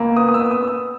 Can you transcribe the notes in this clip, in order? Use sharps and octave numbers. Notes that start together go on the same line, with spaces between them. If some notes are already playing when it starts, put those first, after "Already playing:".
Already playing: C#2 A#3
B3 D#6
D#6
E6
B3
D#6
B3
E6